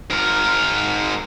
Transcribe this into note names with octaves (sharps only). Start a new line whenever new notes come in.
G#2 A#4